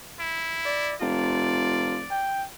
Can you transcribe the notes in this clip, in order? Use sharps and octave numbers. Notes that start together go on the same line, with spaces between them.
E4
D5
F1 F4 D5
G5